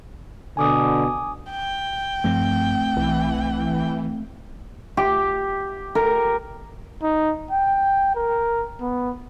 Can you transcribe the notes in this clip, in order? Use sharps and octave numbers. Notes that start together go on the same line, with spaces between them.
B2 D3 G#5 D6 D#6
G5
G2 F3 A3 C4
B1 E3
G4
A#4
D#4
G5
A#4
B3